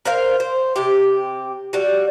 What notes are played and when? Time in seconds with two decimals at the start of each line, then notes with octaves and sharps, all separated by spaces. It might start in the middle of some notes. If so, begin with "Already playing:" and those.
0.05 A#4 C5 F5
0.40 C5
0.76 C3 G4
1.73 G3 F#4